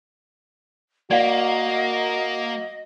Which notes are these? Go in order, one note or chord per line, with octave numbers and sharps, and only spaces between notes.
A#3 F#4 D5 D#5 F5